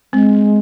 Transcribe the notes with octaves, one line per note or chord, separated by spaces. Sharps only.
G#3 C4